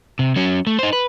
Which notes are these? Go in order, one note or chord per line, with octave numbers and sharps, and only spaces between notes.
C3
F#3 C#4
A3
D#4 C5
B4